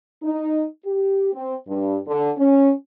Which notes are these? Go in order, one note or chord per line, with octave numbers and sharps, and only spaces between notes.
D#4
G4
C4
G2
D3
C#4